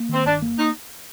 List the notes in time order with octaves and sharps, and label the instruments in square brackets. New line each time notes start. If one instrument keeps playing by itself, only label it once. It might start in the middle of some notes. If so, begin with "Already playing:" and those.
Already playing: [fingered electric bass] A#3
[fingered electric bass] D#3 [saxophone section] C4
[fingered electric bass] G1 [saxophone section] D4
[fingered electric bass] A#3
[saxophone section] D#4